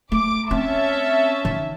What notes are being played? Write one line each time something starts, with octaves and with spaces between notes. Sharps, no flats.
A3 D6
C4 C#4 E5 A5
D#3